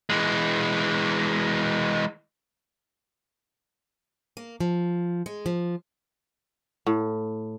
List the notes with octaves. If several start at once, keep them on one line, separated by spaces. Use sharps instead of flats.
E3 G#3
A#3
F3
G#3
F3
A2